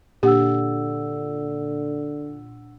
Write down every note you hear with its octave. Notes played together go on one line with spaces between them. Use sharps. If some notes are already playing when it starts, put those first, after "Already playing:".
A#2 D3 D4 G4 F#5 E6